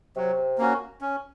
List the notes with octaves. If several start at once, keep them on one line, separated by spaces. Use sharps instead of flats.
C3 F#3
A#3 C#4 F#4
C#4